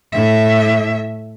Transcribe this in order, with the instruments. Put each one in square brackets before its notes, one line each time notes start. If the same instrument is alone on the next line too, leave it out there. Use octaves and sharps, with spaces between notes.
[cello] A2 E5